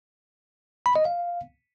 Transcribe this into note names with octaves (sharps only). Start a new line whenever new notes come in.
B5
D#5
F5